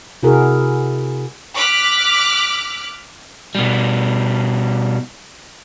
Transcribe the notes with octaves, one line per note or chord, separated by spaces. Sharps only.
C3 E4 F#4 G#4 A#4
D6 F6 F#6 B6
B2 G3